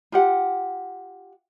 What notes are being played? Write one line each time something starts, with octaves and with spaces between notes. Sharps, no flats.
F4 G4 F#5